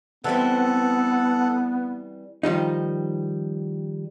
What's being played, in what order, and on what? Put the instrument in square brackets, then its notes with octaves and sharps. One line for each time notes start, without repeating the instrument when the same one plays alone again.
[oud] E3 G3 C4 [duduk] B3 [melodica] A4 F#5
[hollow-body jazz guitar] D#3 F3 G3 D#4